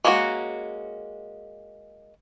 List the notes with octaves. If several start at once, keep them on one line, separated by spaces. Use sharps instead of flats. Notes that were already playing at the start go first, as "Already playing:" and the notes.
G#3 A#3 C#4 E4 F#4